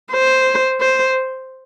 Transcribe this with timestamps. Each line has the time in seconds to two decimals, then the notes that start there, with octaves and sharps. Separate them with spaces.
0.13 C5
0.80 C5